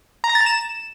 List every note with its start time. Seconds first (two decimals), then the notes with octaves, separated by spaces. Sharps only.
0.24 A#5
0.29 A#6
0.35 A6
0.41 A#5
0.46 E7